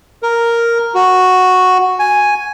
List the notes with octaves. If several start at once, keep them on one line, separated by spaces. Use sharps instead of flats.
A#4
F#4
G#5